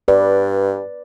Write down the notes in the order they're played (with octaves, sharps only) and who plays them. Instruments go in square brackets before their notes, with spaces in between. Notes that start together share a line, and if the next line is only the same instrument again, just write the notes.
[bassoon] G2 [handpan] B4 D5